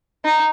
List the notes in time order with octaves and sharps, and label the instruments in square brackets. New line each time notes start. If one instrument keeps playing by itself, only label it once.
[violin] D#4